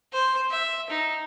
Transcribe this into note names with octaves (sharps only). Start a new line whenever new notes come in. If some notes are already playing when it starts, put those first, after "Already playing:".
C5
E5
D#4